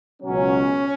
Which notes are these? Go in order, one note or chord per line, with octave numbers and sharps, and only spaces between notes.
C#2 B2 F#3 C#4